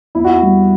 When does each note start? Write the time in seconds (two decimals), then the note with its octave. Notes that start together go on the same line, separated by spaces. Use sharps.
0.15 E2 E4
0.24 F#4
0.34 E4
0.42 G3